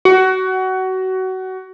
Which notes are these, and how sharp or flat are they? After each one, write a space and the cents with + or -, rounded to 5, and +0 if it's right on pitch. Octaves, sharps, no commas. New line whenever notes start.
F#4 +25